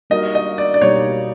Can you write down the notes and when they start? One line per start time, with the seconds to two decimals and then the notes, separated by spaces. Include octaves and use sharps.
0.10 G3 A#3 D#4 F#4 A#4 D#5
0.35 D#5
0.58 D5
0.74 D5
0.81 B2 G3 A#3 D#4 G4 C#5